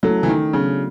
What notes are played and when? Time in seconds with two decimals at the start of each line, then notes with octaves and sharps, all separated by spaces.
0.03 F#3 A3 C#4 E4 A4
0.23 E3
0.28 D#3
0.53 C#3 F#3 B3 D4